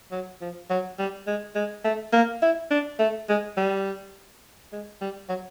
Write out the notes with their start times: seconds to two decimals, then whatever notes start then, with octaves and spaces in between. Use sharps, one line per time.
0.11 F#3
0.41 F3
0.70 F#3
0.99 G3
1.27 G#3
1.55 G#3
1.84 A3
2.13 A#3
2.42 E4
2.71 D4
2.99 A3
3.29 G#3
3.57 G3
4.73 G#3
5.01 G3
5.29 F#3